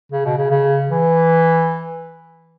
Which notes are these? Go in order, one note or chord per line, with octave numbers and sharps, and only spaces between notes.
C#3
B2
C#3
C#3
E3